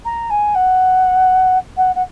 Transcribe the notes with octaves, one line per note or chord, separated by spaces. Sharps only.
A#5
G#5
F#5
F#5
F#5